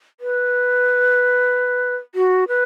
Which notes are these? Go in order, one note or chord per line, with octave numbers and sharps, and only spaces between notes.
B4
F#4
B4